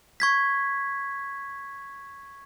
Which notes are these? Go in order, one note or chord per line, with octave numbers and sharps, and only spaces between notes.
C#6 G#6 B6